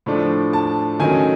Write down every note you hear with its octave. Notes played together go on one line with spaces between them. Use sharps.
A2 F3 A3 D4
A5
D#3 F#3 A3 C#4 G#5